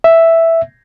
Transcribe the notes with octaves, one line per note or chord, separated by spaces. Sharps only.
E5